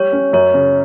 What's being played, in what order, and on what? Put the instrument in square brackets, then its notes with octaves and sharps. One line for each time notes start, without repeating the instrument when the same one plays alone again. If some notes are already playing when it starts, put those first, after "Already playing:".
Already playing: [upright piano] G3 [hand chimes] C#5
[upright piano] C#4
[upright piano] F#2 [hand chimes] C#5
[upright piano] C#3